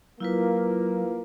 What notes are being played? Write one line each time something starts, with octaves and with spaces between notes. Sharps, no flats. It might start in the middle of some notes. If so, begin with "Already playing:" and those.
F#3 A#3 E4 F4 B4